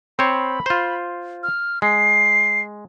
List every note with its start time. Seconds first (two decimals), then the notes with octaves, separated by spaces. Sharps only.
0.19 C4 C5 C#5 B5
0.66 F4 C5
1.43 F6
1.82 G#3 C7